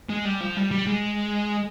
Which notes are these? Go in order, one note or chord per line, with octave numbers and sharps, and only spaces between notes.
G#3
G3
F3
G3
G3
G#3